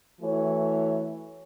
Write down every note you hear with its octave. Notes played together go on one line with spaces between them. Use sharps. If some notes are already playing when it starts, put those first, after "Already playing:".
E3 A3 F#4 C#5